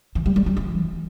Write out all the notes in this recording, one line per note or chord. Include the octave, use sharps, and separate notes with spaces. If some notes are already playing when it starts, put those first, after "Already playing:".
E3
G3
G3
G3
E3